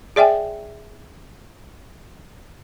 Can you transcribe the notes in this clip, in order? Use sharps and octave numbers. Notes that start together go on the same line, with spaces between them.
G#4 D5 E5 G5 G#5